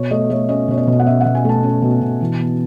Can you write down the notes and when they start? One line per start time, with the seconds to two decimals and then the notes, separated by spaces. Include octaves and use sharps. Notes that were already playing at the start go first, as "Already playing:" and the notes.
Already playing: B2 C#5
0.11 A3 D#5
0.30 A3 C#5
0.49 C#4 D#5
0.68 B2 C#5
0.77 D#5
0.87 B2
0.99 F#5
1.06 C#4 E5
1.21 B2 F#5
1.35 G#5
1.44 A3 A5
1.63 C#4
1.82 B2
2.01 B2
2.21 E3
2.40 B3